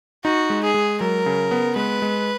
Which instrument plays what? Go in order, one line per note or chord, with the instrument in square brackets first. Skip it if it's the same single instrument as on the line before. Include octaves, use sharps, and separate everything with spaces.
[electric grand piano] D#4 [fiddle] F#4
[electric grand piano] G#3
[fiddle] G#4
[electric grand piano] G#3
[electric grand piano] F#3 [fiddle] A#4
[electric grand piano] C#3
B3
[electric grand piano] G#3 [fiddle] B4
[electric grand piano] G#3